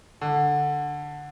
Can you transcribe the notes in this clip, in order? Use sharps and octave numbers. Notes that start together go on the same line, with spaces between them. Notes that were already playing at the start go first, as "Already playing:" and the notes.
D3